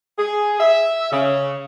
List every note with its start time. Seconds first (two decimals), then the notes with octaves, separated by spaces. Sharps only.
0.19 G#4
0.60 E5
1.12 C#3